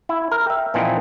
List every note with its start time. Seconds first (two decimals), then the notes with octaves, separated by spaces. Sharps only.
0.09 E4
0.32 A#4
0.47 E5 G5
0.74 A#2 E3 F3 C4 D#4